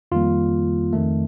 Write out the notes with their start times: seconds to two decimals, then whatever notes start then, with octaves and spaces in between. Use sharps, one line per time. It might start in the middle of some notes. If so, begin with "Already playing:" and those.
0.12 F2 D#3 G3 A#3 F4
0.93 F2 D#3 A3